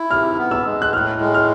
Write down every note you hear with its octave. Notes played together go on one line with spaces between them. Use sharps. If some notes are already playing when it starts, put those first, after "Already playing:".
Already playing: E4
C3 F6
B3
E6
G#3
F#6
A2 F6
G#3
F6